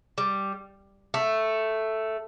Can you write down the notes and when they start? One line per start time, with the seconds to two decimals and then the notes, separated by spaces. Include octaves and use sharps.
0.18 G3
1.14 A3